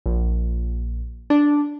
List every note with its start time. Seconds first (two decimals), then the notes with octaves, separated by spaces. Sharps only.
0.06 A#1
1.30 D4